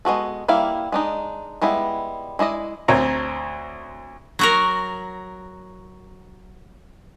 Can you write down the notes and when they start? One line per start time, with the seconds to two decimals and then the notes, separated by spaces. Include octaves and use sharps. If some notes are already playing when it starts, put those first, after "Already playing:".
0.05 G#3 B3 F#4 A4
0.48 G3 A#3 E4 F5
0.92 G#3 D4 D#4
1.61 G3 G#3 B3 E4
2.39 G#3 E4 D5 D#5
2.88 D2 C4 C#5 A#5
4.39 F#3 F#4 A#4